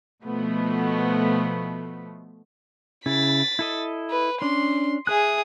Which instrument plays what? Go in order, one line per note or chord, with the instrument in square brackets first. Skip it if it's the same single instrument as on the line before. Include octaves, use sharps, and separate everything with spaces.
[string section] B2 F3 A3 B3
[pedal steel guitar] C#3 E4 [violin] A6 B6
[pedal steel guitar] E4 A4 D#5
[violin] B4
[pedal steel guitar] C#4 D4 [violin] C6
[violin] G#4 D#6 [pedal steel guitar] E5 G#5 F#6